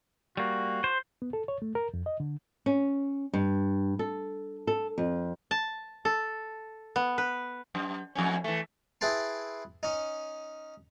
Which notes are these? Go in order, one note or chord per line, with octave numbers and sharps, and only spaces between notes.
G3 A#3 F#4
C5
B3
A4
C#5
A3
A#4
F2
D#5
D3
C#4
G2
A4
A4
F2
A5
A4
B3
B4
F#2
F2 A2 C#4
E3 A3
E4 G#4 B4 G5 A5 C6
C#4 D#4